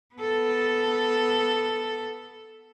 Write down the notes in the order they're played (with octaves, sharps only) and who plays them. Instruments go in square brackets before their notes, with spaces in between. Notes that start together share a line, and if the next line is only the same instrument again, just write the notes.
[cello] B3 A4